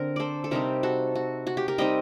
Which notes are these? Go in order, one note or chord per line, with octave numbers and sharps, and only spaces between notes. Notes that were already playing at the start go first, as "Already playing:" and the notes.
Already playing: D3 C4 A#4
A4 C5 D5
A4
C3 G3 C4 D#4 G4 A#4
F#4 A4
F#4
F#4
G4
G4 A#4
G3 C4 D#4 D#5 G5